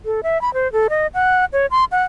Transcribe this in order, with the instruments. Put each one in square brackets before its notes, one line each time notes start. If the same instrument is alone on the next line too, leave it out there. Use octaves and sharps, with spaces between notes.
[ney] A4
E5
B5
C5
A4
D#5
F#5
C#5
C6
F#5